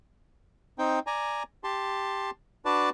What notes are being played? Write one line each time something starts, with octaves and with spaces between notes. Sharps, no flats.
C4 D#4 G5
D5 G#5 A#5
G4 A5 C6
D4 F#4 B4 D5 A5